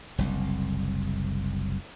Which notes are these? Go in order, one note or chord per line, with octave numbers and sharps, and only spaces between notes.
F#1 C2